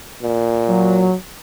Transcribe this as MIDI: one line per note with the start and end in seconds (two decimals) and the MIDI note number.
0.22 1.09 46
0.69 1.14 54